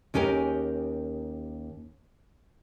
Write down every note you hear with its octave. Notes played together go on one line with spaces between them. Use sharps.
D#2 C#4 G4 G#4 A#4